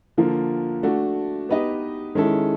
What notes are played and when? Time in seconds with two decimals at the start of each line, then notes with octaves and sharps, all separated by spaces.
0.17 D3 F3 A#3
0.83 A3 D4 F#4
1.49 B3 D#4 G4 B4 D#5
2.15 D#3 G#3 C#4 E4 A4